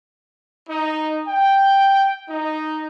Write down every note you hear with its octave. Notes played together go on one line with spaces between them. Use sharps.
D#4
G5
D#4